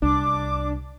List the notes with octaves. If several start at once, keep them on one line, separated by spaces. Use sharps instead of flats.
C2 D4 D6